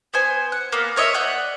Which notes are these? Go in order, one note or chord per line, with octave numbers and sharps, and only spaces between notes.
B3 C5 G#5
F#5
A#3 B3
A#4 C#5 D#5 E5
D5 F#5 G6